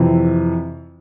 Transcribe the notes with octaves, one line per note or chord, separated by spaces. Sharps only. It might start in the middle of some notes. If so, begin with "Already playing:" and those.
Already playing: F2 C3 E3